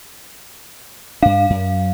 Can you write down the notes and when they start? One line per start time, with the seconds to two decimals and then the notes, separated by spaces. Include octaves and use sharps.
1.22 G2 D4 F5
1.50 F#2